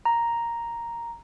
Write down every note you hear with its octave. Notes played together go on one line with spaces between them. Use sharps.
A#5